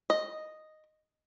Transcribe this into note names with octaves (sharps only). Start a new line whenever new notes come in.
D#5